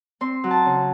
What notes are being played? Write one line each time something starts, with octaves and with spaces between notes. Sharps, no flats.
C4 C6
F#3
A5
C#3